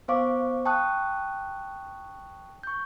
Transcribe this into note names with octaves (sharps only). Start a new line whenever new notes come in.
B3 C5 F5 C#6 D6
G5 A5 C#6 D#6 F#6
C#6 G6